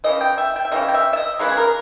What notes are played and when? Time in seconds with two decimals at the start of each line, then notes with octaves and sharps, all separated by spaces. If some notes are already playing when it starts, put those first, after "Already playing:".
0.04 C#3 E3 C#4 D#5
0.21 G5
0.38 E5
0.56 G5
0.65 E5
0.72 C#3 E3 C#4 D#5
0.88 G5
0.94 E5
1.13 E5
1.17 D#5
1.39 C#3 E3 G#3 C#4 B4
1.49 G#4
1.57 A#4